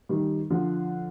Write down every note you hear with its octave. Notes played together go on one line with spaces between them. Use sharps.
D#3 G3
D3 F3